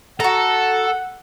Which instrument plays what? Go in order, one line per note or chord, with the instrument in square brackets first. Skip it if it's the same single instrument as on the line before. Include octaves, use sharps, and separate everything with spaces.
[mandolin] F#4 A#5 [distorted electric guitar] A4 [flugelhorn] F#5